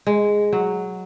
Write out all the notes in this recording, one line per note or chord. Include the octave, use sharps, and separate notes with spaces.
G#3
F#3